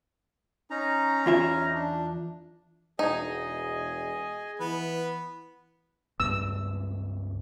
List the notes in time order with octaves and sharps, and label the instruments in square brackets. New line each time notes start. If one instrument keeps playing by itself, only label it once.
[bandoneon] C#4 D#4 A#5
[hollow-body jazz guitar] E2 F4 E5
[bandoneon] D4
[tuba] E1 [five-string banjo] D#4 [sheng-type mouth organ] G#4 D#5 G#5
[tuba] E3 [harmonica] B3 B4
[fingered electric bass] C#2 G2 B3 [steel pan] E6